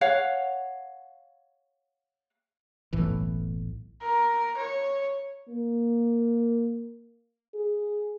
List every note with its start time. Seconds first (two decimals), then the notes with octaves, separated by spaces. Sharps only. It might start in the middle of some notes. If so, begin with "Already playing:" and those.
0.01 C#5 F5 F#5
2.93 F#1 B1 A2 E3
4.02 A#4
4.57 C#5
5.49 A#3
7.54 G#4